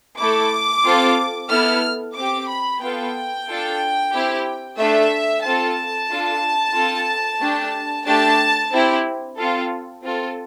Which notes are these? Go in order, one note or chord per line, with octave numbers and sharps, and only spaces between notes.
A3 E4 A4 D6
C4 F4 A4
B3 E4 A4 F6
C4 G4 D6
B5
B3 F4 A4 G5
D4 F4 A4
C4 E4 G4
A3 D4 A4 E5
C4 F4 A4 A5
D4 F4 A4
C4 F4 A4
A3 D4 G4
A3 D4 G4 A5
C4 E4 G4
C4 F4 A4
C4 F4 A4